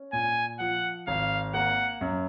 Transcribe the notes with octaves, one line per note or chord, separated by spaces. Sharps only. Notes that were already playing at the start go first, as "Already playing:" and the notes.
Already playing: C#4
A#2 G#5
F3 F#5
G#1 F5
A#3 F#5
F#2